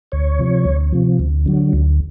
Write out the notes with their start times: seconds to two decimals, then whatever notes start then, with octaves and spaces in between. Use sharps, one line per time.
0.12 D2 C#5
0.39 C3 F3
0.65 D2
0.92 C3 F3
1.19 D2
1.46 D3 F#3
1.73 D2